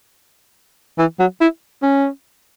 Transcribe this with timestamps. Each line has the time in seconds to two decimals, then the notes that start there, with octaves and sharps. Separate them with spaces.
0.98 E3
1.19 F#3
1.41 E4
1.82 C#4